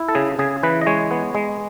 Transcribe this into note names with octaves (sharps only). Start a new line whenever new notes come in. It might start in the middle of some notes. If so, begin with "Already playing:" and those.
Already playing: E4
A4
C#3 G#4
C#3 G#4
E3 B4
D#5
G#3 C#5
B3
G#3